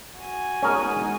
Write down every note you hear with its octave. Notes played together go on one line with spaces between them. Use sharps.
F#4 G#5
G#3 B3 C#4 D#4 G#4 A#4